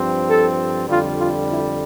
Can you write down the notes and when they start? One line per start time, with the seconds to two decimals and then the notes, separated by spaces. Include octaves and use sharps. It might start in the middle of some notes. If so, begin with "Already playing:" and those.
Already playing: G2 F3 C4
0.28 A4
0.88 F2 D3 G3 F4
1.19 F4
1.49 E4